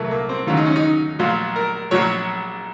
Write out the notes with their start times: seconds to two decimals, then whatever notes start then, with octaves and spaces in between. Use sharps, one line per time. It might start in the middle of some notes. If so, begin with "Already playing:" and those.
Already playing: C2 A#2 F#3 A3 A#3
0.11 A#3
0.29 C4
0.47 D#2 C#3 F#3 F4
0.57 D#4
0.66 C#4
0.76 D#4
1.19 A#1 A#2 F#3 F4
1.56 A#4
1.91 A#1 A#2 F#3 C#5